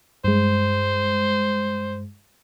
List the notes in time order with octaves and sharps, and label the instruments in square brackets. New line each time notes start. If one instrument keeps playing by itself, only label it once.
[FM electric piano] G2 G#3 [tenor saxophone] C5